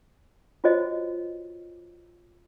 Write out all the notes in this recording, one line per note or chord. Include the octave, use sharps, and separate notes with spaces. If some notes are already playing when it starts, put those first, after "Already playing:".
F4 F#4 C5 C#5 D#5